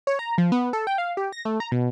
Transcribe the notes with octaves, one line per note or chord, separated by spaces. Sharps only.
C#5
A#5
F3
B3
A4
G5
F5
G4
A#6
A3
A#5
B2